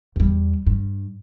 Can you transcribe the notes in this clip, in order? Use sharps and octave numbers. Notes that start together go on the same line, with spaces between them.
E2 G3
G2